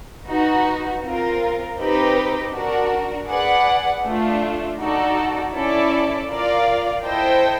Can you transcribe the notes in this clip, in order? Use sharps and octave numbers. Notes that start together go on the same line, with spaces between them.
D#4 F#4 B4
C4 F4 A#4
C4 D#4 G4 B4 D#5
D4 F#4 A#4
G#4 B4 D5 F#5
A3 D4 F4
D#4 F#4 A4 D5
C#4 E4 A4 D5
F4 A#4 D5 F5
E4 A4 C5 D#5 G5